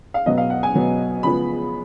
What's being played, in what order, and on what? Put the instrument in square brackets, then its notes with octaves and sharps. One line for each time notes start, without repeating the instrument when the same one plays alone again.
[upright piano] F5
B2 F#3 B3 D#5
F5
F#5
G#5
B2 F#3 B3
C#3 F3 G#3 B3 B5